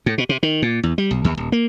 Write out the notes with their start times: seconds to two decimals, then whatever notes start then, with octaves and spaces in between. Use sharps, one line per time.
0.06 A2
0.18 B2
0.29 C3
0.43 D#3
0.62 A#2
0.83 E2
0.98 G3
1.11 B1
1.24 D#2
1.37 D#1
1.52 A#3